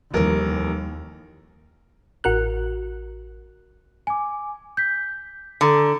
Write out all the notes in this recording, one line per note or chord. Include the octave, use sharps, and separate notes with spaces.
F1 D#2 E3 G3 A#4
A1 F#4 A#4 F#6
G#5 D6
G6 B6
D3 A4 A#5 C#7